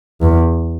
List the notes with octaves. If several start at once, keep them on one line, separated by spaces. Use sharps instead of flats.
E2